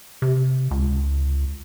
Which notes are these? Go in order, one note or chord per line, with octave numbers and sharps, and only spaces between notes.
C3
C#2